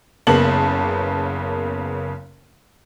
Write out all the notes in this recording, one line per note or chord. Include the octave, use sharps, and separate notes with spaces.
F#1 C#3 A#3 B3 A5 F#7